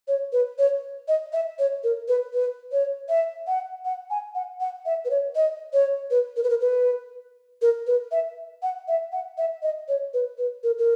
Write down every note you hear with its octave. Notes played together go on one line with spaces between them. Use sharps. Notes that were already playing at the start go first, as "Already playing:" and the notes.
C#5
B4
C#5
D#5
E5
C#5
A#4
B4
B4
C#5
E5
F#5
F#5
G#5
F#5
F#5
E5
B4
C#5
D#5
C#5
B4
A#4
B4
A#4
B4
A#4
B4
E5
F#5
E5
F#5
E5
D#5
C#5
B4
B4
A#4
A#4